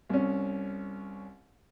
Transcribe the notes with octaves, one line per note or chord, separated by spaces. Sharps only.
C2 C#4